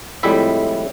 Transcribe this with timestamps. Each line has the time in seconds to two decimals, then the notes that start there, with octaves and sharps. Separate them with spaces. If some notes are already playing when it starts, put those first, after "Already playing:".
0.23 F2 A2 G3 G#3 E4 E5